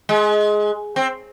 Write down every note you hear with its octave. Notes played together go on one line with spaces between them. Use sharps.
G#3
C4